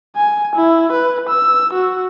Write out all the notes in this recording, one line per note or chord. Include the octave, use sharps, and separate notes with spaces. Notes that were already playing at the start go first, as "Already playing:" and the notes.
G#5
E4
B4
E6
F#4